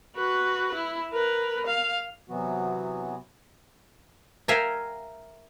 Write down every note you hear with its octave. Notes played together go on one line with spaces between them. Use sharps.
F#4 B4
E4
A#4 B4
F5
C3 E3 F#3 B3 F#4
A#4 E5 F5 G5 G#5 A#5